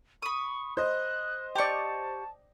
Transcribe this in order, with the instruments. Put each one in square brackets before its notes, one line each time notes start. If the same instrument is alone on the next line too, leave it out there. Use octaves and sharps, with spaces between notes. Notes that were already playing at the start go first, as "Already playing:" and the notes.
[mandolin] B5 D#6 [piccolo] C#6
[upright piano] C5 D#5 [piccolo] F#6
[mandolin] G4 C#6 [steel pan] D5 G5 [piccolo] A5